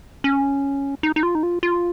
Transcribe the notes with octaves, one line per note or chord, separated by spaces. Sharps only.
C#4
D#4
D#4
F4
D#4
F4
F4